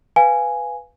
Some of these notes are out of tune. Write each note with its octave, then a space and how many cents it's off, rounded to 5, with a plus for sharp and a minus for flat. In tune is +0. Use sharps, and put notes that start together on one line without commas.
B4 +0 F5 +0 G#5 +0